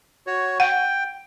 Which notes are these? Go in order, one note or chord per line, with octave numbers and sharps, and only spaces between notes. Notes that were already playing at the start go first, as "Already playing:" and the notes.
F#4 C#5
F#5 G5